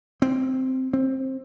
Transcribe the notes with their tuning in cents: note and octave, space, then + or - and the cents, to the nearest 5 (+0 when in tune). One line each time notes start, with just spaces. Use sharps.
C4 -5
C4 +20